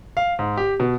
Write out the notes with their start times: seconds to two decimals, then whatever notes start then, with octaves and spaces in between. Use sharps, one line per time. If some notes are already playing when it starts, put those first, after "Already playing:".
0.17 F5
0.39 G#2
0.57 G4
0.80 B2